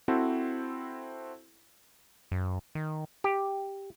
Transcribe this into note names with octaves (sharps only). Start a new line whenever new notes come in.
C4 E4 F#4 A4 C5
F#2
D#3
G4